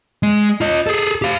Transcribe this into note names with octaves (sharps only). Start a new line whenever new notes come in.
G#3
F4 D#5
G#4 A4
G4 F5